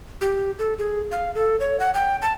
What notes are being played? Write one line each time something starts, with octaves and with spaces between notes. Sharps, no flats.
G4
A4
G#4
F5
A4
C#5
F#5
G5
A5